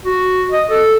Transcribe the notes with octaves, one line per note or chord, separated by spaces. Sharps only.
F#4
D#5
A4